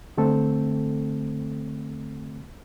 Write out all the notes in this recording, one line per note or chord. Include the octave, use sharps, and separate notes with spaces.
D3 A3 C4 A4